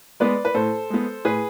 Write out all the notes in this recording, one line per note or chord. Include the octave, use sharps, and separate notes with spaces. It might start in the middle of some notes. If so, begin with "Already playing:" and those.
G#3 B3 B4 D5
B4
A2 A4 C5
G#3 B3
A2 G#4 B4